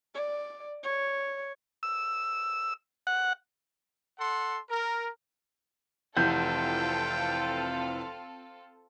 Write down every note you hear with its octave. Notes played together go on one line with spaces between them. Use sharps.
D5
C#5
E6
F#5
A4 F#5 C6
A#4
F1 E3 C4 F4 A4 F#5 G5 G6